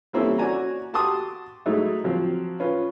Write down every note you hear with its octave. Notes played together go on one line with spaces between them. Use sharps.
G3 A#3 C4 C#4 E4 A4
C#4 F#4 D5 G#5 A#5
F#4 G4 A5 C6 D6 D#6
F#3 G#3 A3 D#4 E4
F3 F#3 C4
C#4 F4 B4